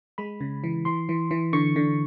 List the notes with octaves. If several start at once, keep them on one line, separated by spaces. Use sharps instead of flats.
G#3 B5
C#3
E3
E3 C6
E3
E3
D3 C#6
D3